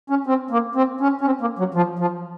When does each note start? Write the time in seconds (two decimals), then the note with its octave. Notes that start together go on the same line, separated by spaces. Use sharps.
0.10 C#4
0.27 C4
0.51 A#3
0.75 C4
1.00 C#4
1.21 C#4
1.26 C4
1.41 A#3
1.59 F#3
1.74 F3
1.99 F3